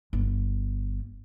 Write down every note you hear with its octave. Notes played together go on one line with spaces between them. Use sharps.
G1